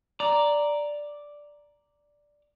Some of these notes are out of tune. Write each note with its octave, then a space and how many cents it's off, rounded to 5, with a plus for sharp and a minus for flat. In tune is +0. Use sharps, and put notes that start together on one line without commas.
D5 +0 A#5 +0